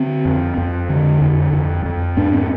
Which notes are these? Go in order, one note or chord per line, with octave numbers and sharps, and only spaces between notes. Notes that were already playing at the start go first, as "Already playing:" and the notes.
Already playing: D3 C4
F2
F2
D3
F2
F2
F2
G#2 D4
C4